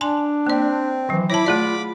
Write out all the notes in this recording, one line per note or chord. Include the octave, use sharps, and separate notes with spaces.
D4 G#5 A5 C6
A#3 C4 D5
D#3 E3 F#3
E4 C#5 A5 B5 D6
A3 F4 G#4 D5